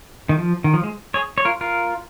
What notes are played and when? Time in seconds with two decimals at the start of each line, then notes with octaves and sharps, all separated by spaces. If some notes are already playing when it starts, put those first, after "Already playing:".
0.29 D#3
0.38 F3
0.64 D#3
0.74 F3
0.84 G#3
1.14 G#4 C#5
1.38 C#5
1.45 F4 A#4
1.61 F4 A#4